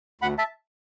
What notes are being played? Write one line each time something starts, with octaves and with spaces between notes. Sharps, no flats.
D2 F#5 B5
E5 A5